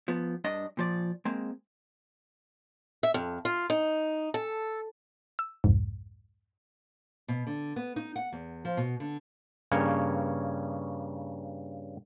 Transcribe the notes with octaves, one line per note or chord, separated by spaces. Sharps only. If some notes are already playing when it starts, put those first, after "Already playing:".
F3 B3
G2 D4 D#5
A#2 F3 D5
G#3 A#3 C4
E5
F2
F4
D#4
A4
E6
C2 F2 G#2
B2
D3
B3
D#4
F#5
E2
F3
B2
D3
G2 C#3 A#3 C#5